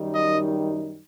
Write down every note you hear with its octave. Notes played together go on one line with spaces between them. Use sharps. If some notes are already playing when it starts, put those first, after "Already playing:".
Already playing: F#2 D#3 G3 D#4
D#5